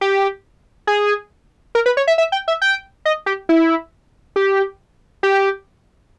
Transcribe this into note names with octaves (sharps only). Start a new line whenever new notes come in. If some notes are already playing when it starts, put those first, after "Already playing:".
G4
G#4
A#4
B4
C#5
E5
E5
G5
E5
G5
D#5
G4
E4
G4
G4